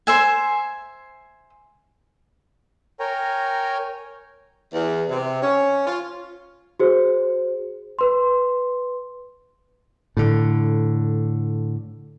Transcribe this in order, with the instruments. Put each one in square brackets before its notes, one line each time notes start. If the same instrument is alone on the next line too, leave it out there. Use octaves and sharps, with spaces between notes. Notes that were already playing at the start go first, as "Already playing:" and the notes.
[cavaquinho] C5 E5 G#5
[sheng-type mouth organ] A#4 C#5 G5 G#5 A#5
[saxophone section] E2
C3
C#4
F4
[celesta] F#4 G#4 C5
B4 C6
[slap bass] A2 D3